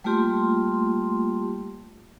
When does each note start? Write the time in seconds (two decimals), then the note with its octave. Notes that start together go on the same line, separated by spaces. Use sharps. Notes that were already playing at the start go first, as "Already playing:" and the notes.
0.04 G3 A3 A#3 F4 G4 C6